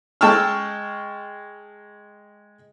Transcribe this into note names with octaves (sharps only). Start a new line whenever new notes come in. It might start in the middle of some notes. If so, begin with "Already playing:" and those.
G#3 G5 A5 C#6 E6 F6